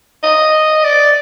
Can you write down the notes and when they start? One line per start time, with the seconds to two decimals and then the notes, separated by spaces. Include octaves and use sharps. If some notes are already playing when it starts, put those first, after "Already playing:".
0.23 D#5
0.84 D5